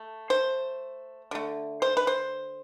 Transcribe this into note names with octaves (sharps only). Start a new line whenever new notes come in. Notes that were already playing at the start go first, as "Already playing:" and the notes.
Already playing: A3
C5
D3 A3
C5
B4
C5